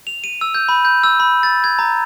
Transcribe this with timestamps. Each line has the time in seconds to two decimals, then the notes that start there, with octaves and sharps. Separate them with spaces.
0.07 F7
0.24 D#7
0.41 E6
0.55 G6
0.69 B5
0.85 G6
1.04 E6
1.20 B5
1.43 A6
1.64 G#6
1.79 A#5